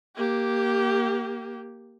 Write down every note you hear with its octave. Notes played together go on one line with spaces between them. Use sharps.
A#3 G4